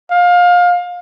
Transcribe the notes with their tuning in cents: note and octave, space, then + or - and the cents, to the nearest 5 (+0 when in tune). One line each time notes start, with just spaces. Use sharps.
F5 +25